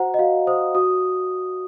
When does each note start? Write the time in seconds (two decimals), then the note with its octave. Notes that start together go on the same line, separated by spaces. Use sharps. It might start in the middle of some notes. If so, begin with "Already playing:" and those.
Already playing: F#4 C5 F#5 A#5
0.14 D#5
0.19 F#4 F5
0.47 C5 D#6
0.75 F#4 D#6